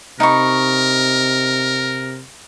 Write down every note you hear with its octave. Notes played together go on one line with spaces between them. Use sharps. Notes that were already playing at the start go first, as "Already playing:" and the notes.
C3 D#4 A#4 B5 C#6